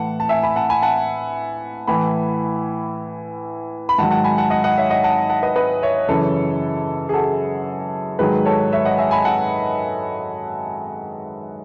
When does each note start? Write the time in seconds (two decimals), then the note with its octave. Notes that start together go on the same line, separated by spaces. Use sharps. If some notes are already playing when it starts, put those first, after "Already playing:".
Already playing: A2 E3 F#5 A5
0.20 A5
0.29 E5 G#5
0.43 G#5 B5
0.56 F#5 A5
0.70 G#5 B5
0.83 F#5 A5
1.87 A2 E3 G#5 B5
3.89 B5
3.98 G#2 D#3 F#3 F#5 A5
4.11 F#5 A5
4.24 G#5 B5
4.38 F#5 A5
4.50 D#5 F#5
4.64 D#5 F#5
4.78 C#5 E5
4.90 D#5 F#5
5.04 F#5 A5
5.30 F#5 A5
5.43 B4 D#5
5.56 B4 D#5
5.82 C#5 E5
6.08 F#2 C#3 E3 A4 C#5
7.09 G#4
7.14 F#4 A4
8.19 G#2 D#3 F#3 G#4 B4
8.45 A4 C#5
8.72 C#5 E5
8.85 D#5 F#5
8.98 E5 G#5
9.11 G#5 B5
9.25 F#5 A5